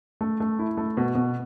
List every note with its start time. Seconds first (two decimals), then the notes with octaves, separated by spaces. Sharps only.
0.21 A3
0.40 A3
0.59 E4
0.77 A3
0.97 B2
1.15 B2